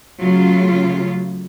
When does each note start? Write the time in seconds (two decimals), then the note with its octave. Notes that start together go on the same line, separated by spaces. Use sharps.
0.20 C#3 F#3 A3 F4